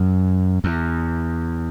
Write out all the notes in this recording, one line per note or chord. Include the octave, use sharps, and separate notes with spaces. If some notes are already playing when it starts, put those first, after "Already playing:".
Already playing: F#2
E2